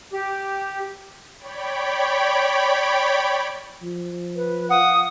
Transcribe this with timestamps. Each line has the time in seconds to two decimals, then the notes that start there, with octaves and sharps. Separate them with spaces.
0.13 G4
1.37 C#5 D5 G5 B5
3.83 F3
4.36 B4
4.70 F5 F#5 D#6